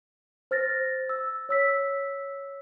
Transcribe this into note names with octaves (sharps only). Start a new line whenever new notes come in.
C5 F6 A6 A#6
E6
C#5 E6 B6